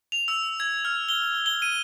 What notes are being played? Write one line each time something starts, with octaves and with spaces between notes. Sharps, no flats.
F7
E6
G#6
F6
G7
G7
D#7